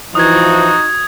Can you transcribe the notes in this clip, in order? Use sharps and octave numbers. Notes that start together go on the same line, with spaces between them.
E3 F3 D#4 F#4 D#6 G#6